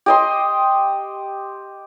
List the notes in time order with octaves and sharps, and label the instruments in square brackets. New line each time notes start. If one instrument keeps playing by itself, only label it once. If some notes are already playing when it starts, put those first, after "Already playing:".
[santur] G4 D#5 C6